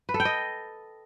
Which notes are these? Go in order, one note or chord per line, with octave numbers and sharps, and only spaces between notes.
B4
A4
G5
D#5